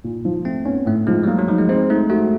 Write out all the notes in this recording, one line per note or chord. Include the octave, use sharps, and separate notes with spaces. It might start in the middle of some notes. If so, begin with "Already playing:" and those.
A#2
F3
A3 C4
B3 C#4
A2 A3
F3 G#3
G3
F#3 A#3
F#3
F3 D#4
G#3
G#3 C4
A3 D#4
A3 F#4